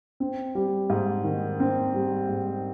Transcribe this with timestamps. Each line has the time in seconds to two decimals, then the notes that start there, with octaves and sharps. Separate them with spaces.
0.20 C4
0.55 G3
0.90 G#2
1.24 D#3
1.60 C4
1.94 G3
2.29 G#2